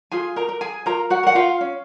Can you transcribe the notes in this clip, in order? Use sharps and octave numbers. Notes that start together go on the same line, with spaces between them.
F4 G#4 G#5
A#4 A#5
A#4
G#4 G#5
F4 A#4 A#5
F#4 F#5
A#4 F#5
F4 F5
C#4